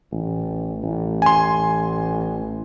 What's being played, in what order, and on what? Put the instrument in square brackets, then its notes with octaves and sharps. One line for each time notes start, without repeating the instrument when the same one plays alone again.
[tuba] A1
A1
[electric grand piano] G#5 C6